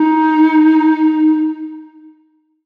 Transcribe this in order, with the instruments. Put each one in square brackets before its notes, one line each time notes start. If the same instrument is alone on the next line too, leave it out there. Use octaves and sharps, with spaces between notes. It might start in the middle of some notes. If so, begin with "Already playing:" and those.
Already playing: [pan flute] D#4